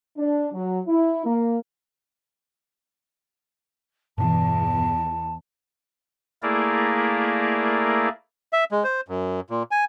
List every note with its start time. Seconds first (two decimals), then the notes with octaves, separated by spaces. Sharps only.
0.17 D4
0.53 F#3
0.86 E4
1.25 A#3
4.18 E2 G2 B2 E3 A5
6.43 A3 A#3 E4 G#4 A#4 D5
8.53 E5
8.71 G#3
8.84 C5
9.08 F#2
9.50 A#2
9.71 G#5